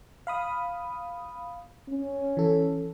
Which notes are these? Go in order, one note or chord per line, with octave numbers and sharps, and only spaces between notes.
F5 B5 D#6
C#4
E3 A4